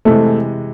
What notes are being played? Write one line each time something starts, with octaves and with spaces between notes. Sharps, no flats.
C3 E3 G#3 A3